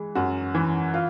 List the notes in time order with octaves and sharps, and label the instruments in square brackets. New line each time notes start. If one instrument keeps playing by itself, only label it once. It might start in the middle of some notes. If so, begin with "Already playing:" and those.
Already playing: [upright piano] E3 G#3
F#2 F#4
E3
F4